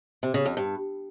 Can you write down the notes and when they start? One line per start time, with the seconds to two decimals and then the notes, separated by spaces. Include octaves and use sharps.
0.23 C3
0.34 C#3
0.45 F2
0.57 G2